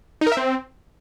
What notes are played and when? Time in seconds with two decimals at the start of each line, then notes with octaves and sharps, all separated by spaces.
0.21 D#4
0.27 A#4
0.32 E5
0.37 C4